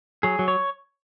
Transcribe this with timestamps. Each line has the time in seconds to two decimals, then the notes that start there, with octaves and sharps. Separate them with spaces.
0.23 F#3 G#4
0.39 F#3
0.48 C#5